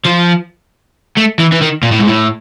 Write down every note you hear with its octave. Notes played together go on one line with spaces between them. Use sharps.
F3
A3
E3
E3
D#3
A#2
A2
G#2
A2